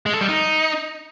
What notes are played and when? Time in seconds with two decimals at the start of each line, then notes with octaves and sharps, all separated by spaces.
0.06 G#3
0.14 A4
0.21 G3
0.29 D#4